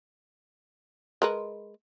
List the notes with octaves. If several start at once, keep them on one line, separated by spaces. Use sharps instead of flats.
G#3 A#4 B4